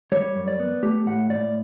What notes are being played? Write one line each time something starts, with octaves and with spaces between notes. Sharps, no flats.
G3 C#5
F#2
D5
B3
A3 G4
A2 F#5
A2 D5